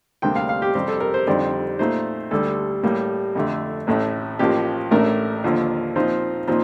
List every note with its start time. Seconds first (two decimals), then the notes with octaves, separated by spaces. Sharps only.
0.22 D2 C3 G3 A#3 D4 G5
0.36 F5
0.49 F5
0.62 G4
0.74 F2 C3 G3 C4 G4
0.88 A4
1.00 A#4
1.14 C5
1.27 F2 D3 G3 C4 D#4 D5
1.79 A#2 A3 D#4 C5
2.31 D2 D3 G3 A4
2.83 A2 G3 A#3
3.35 F2 D3 A3
3.87 A1 A2 A3
4.39 A1 A2 F3 A#3 G4
4.91 A1 A2 A3 D4 A#4
5.44 D#2 D3 F3
5.96 A#2 F3 C4 D#4
6.48 A#2 F3 C4 D#4